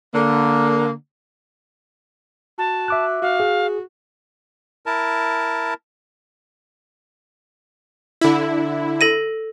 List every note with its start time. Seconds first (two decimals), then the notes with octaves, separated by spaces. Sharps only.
0.14 D3 A#3
2.58 F#4 A5
2.88 E5 D6 F#6
3.22 F#4 F5
3.40 G#4
4.86 E4 A#4 A5
8.21 D3 E4
9.01 A4 A#6 D#7